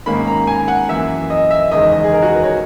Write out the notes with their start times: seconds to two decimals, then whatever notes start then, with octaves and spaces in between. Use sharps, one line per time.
0.06 G#2 D#3 A#3 C#4 B5
0.27 A#5
0.47 G#5
0.68 F#5
0.89 F#2 E3 A#3 E5
1.30 D#5
1.51 E5
1.71 F#1 E2 D#3 G#3 D#5
1.92 D#5
2.04 G#4
2.13 A#4
2.22 F#4
2.33 B4
2.43 C#5